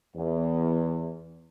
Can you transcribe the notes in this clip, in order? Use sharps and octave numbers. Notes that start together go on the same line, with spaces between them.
E2